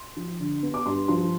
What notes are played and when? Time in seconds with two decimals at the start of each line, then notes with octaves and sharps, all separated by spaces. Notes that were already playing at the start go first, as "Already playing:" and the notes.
Already playing: C6
0.17 F3
0.40 D3
0.63 B3
0.74 D6
0.86 G2 C6
1.08 F3 C6